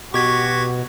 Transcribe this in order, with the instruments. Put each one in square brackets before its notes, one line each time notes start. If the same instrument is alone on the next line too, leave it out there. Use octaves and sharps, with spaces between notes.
[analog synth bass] B2 [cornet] F#4 [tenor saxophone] G4 [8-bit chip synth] C#6 G#6 B6